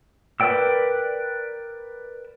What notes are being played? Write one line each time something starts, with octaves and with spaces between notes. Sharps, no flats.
A#4 B4 D5 G5 E6